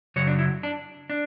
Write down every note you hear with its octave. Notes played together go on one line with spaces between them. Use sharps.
F#2 C#3 F#3 C#5
D4
E4
D4
D4